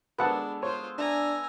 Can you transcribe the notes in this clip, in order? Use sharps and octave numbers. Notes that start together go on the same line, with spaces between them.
G#3 B3 D4 A4 B4 F#5 A5
F4 C5 C#5
D4 E5 G#5 A#5